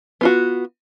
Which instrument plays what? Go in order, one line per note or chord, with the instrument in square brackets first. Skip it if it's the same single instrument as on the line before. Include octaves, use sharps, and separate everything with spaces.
[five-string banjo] B3 F4 F#4